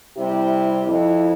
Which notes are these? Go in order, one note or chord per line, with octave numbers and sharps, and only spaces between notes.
C3 G3 E4 G4
F2 E4